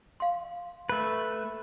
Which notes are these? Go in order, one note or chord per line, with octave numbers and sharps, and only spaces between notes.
F5 C6
A3 B4